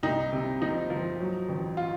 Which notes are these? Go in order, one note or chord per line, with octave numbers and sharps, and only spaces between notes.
C2 D#4
C3
F3 D#4
F3
F#3
A1
F4